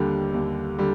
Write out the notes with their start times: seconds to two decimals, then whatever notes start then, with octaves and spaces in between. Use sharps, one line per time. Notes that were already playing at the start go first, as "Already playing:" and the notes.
Already playing: D#2 D3 G3
0.34 D#2
0.78 D3 G3